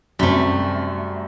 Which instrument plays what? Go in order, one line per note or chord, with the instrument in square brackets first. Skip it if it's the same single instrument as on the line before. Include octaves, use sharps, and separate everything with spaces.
[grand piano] F#2 C3 C4 [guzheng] G3 A3